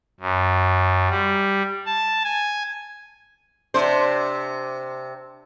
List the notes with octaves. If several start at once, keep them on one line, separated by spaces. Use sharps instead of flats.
F#2
G3
A5
G#5
C3 D4 C5